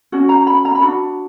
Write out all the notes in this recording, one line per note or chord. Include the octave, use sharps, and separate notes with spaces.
C#4 F#4
A#5
B5
A#5
B5
D4 F#4